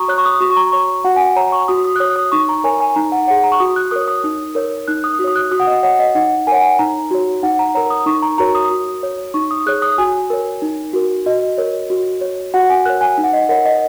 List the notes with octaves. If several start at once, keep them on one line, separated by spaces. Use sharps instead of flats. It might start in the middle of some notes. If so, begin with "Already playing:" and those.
Already playing: F#4 A#5 C#6 D#6
C#5 F#6
C#6
D#6
F#4 C#6
C#6
A#5
C#5 C#6
F#4 F#5
G#5
F#5
C#5 A#5
C#6
F#4 D#6
D#6
F#6
C#5 D#6
D#6
D#4 C#6
A#5
A#4 C#5 G#5
G#5
D#4 A#5
F#5
G#4 C#5 F#5
A#5
C#6
F#4 D#6
F#6
A#4 C#5 D#6
D#6
D#4
A#4 C#5
D#4 F#6
D#6
F#4
C#5 D#6
F#6
F#4 D#6
F#5
D#5
C#5 F#5
D#5
D#4 F#5
A#4 C#5 F#5 G#5
G#5
D#4 A#5
F#4 C#5
D#4 F#5
A#5
A#4 C#5 A#5
D#6
D#4 C#6
A#5
F#4 A#4 C#5 A#5
D#6
F#4
C#5
D#4 C#6
D#6
G#4 C#5 F#6
D#6
F#4 G#5
A#4 C#5
D#4
F#4 A#4
F#4 D#5
A#4 C#5
F#4
C#5
F#4 F#5
G#5
A#4 C#5 F#6
G#5
D#4
F#5
D#5
A#4 C#5 F#5
D#5